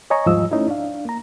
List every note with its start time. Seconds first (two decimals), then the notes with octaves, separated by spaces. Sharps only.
0.10 C#5 D#5 G#5 A#5 C#6
0.26 D#2 G#2 F3 G3 D#5 E6
0.52 A3 C#4 D#4 E4
0.68 D4 F5
1.05 A#3 A#5